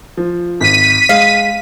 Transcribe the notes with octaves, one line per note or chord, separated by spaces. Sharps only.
F3
G#1 B6 D#7
G#3 F5